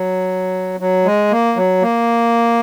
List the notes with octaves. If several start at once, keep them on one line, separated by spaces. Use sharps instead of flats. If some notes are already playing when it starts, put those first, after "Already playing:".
Already playing: F#3
F#3
G#3
A#3
F#3
A#3